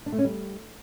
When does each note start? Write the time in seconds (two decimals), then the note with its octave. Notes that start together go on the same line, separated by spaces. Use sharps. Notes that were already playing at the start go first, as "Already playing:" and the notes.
0.06 D4
0.12 A3
0.18 C#4
0.25 G3